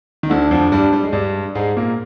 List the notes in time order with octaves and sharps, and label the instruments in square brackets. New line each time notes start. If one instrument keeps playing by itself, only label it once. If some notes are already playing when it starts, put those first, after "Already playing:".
[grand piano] D#3
[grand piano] D2 D3 [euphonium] D4
[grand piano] F2 F3
G2 G3
G3
G#3
[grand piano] G2 G3 [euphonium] D4
[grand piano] G#2 G#3
A#2 A#3